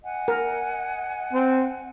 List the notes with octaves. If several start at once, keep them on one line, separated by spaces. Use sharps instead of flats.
D#5 F#5 G#5
A#4
C4